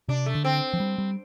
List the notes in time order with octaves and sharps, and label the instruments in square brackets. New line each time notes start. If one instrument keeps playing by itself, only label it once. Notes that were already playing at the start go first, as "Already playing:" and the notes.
[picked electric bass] C3 [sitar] D4
[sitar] A3
[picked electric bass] D3
[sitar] C4
[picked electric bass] F3
G3
G3